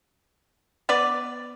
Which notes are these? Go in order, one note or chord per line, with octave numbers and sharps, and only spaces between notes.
B3 B4 D5